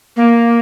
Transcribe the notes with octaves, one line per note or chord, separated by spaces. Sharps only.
A#3